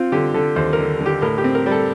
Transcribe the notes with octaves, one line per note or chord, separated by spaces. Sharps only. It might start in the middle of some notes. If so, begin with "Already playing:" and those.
Already playing: C4 F4
D3 G4
D3 A4
D#2 C5
A#4
D3
D3
G4
A2 A#4
G4
C4
A#4
G3
A4